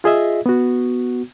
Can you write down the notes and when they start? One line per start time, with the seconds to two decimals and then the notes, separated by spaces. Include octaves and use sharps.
0.04 F4 G#4 D#5 E5
0.46 B3 F#4